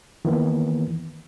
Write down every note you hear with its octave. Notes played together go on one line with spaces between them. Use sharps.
D#3 E3 A#3 B3